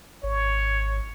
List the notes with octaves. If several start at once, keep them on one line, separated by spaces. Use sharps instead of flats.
G#1 C#5